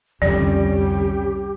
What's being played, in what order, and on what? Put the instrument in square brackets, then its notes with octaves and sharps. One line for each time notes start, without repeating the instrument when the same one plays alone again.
[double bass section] C2 G3 C#4 [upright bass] F2 D3 [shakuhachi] G4 [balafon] D5